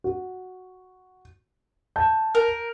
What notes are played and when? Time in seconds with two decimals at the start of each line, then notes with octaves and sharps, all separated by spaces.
0.04 F#4
1.96 A5 G6
2.35 A#4